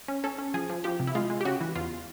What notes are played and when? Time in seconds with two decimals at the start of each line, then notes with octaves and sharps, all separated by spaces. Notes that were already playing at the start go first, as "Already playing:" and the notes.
0.08 C#4
0.24 C#4 A4
0.39 C#4
0.54 F3 G#4
0.70 F3
0.84 F3 G4
1.00 C3
1.07 E4
1.15 G#3 F4
1.30 G#3
1.41 G4
1.45 C#3 F#4
1.61 E3
1.75 E2 F4